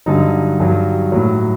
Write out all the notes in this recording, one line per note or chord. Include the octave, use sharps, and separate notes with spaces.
G2 D3 F#3 D#4
G2 F#3
A2 F#3